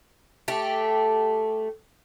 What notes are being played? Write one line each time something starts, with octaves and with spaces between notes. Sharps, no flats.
A3 G4